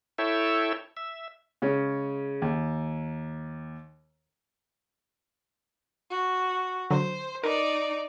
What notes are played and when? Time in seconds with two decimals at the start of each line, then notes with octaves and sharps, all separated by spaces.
0.18 E4 A4 C#5 E5 G5
0.97 E5
1.62 C#3 G#3 C#4
2.42 D#2
6.10 F#4
6.91 D3 F#3 C5
7.44 D#4 A#4 B4 D5